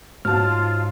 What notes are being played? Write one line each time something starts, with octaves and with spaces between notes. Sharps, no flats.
G#2 F#3 F4 A5 F6